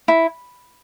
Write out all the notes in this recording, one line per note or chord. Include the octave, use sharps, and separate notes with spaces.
E4